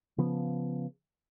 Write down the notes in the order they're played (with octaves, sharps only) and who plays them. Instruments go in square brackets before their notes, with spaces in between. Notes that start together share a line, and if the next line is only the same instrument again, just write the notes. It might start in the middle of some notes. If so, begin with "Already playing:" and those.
[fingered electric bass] C#3 F3 B3